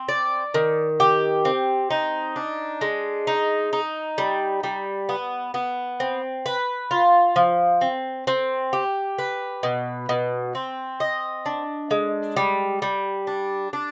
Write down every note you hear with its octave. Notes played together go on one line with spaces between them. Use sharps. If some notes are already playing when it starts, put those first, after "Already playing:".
Already playing: C4
D5
D#3
G4
C4
D#4
D4
G#3
D#4
D#4
G3
G3
B3
B3
C4
B4
F4
F3
C4
C4
G4
B4
B2
B2
C4
D#5
D4
G#3
G3
G3
D4
D4